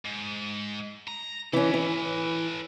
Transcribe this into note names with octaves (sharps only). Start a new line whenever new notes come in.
G#2
A#5
E3 C#4 A4 B4
E3